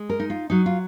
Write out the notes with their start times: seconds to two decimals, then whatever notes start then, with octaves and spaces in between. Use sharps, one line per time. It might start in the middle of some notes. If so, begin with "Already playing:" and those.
Already playing: G#3
0.10 A#4
0.20 D#4
0.30 F4
0.50 F#3 D#4
0.66 F4